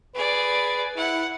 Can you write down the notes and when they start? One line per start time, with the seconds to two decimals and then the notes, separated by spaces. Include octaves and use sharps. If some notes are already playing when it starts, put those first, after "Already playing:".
0.15 G#4 B4 D5
0.97 E4 F#5